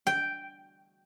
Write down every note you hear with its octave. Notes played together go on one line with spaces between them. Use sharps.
G5